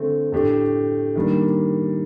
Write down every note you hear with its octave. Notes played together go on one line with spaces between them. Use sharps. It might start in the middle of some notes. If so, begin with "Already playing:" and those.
Already playing: D3 A3 C4
A2 A3 D4 G4
D#3 G3 A#3 D4